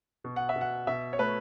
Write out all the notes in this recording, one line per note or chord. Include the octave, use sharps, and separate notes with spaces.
B2
F#5
E5
B2
F#5
B2 E5
C#5
A3 B4